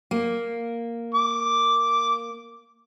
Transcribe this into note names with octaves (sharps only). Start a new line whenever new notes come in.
A#3
D6